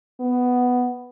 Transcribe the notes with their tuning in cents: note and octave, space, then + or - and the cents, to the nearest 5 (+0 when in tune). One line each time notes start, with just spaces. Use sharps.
B3 +5